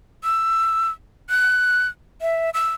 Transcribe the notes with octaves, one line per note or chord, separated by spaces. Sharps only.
E6
F#6
E5
E6